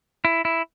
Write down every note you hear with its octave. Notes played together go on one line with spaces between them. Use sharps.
E4
E4